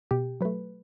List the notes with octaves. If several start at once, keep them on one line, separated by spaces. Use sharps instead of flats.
B2 G4
F#3 A3 B4